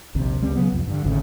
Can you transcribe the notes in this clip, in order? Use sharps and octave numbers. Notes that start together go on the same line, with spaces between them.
A#1 D#2 C3
C#2 G3 C4
C#3 F#3 B3
C2 F2
G2 D3
G#1 D2 A2 C#3